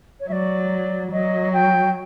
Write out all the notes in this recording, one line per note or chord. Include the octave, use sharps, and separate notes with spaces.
C#5
F#3 D5 E5
F#3 D#5
G5